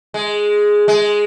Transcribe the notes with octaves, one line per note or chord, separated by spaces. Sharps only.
G#3
G#3